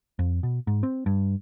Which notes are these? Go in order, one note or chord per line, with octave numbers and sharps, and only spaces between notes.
F2
B2
G#2
C4
G2